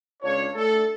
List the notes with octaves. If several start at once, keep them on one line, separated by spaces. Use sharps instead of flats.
C#2 D4 F4 C#5
A3 D4 A4